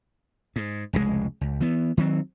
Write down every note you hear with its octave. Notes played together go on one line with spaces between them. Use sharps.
G#2
F1 C#2 G#2 G#3
C#2
E3 B3
D#3 F#3 B3 C4